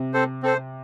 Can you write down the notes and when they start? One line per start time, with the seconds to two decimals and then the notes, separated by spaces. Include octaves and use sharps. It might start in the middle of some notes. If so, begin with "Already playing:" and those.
Already playing: C3
0.13 C4 A4 C5
0.43 C4 A4 C5